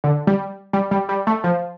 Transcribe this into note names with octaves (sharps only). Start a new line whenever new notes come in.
D3
G3
G3
G3
G3
A3
F3